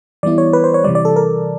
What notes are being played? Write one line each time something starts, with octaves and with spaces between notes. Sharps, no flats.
E3 G3 B3 E4 D5
C#5
B4
C5
C#5
C3 E3 G3 D5
D5
A4
A#4